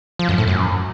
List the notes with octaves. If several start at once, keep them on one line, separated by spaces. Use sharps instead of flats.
F3
F#2
A2
F#2